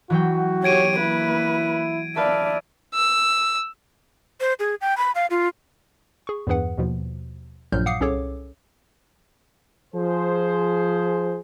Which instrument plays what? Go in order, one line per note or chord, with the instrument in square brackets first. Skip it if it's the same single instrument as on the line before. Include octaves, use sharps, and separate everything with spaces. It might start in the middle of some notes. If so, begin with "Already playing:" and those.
[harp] E3 F#3 G5 [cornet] F#4
[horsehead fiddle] G4 C#5 [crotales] G#6 D7 D#7
[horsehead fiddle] A#3 B4 [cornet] E4
[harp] A4 B4 F5 [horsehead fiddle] D5 E5
[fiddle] E6
[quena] C5
G#4
G5
B5
F5
F4
[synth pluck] G#4 C#6
E2 G2 E3 G#4 B4 F#5
D#2 B2 F3
A#1 G2 A#2 F#3 F6 G6
F5 F#5 D6 D#6 C7 C#7
C2 C#4 G#4 A4 C#5 D6
[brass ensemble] F3 G#4 C5